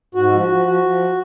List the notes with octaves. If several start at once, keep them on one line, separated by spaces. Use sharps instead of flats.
G#2 F#4
F3
F#4
F3
F3 F#4
F3